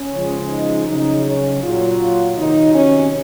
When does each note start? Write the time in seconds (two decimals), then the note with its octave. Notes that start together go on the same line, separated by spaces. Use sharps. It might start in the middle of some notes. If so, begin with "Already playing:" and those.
Already playing: C#4
0.12 C#3 F3 G#3
0.49 D#4
0.87 C#3 F#3 D#4
1.25 C#4
1.62 A#2 F#3 F4
2.37 C3 D#3 F#3 D#4
2.74 C#4